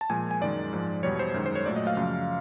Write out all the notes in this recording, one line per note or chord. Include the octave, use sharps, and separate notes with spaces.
A5
A#2 F3 G#3 G#5
G#5
F#2 D#3 G#3 D5
G#2 F3 G#3
E2 B2 G3 C#5
C5
F#2 D#3 G#3
C5
C#5
A#2 F#3 A3 D5
D#5
F5
F#2 C#3 F3